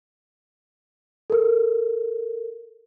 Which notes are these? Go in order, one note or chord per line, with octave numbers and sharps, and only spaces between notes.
A4 A#4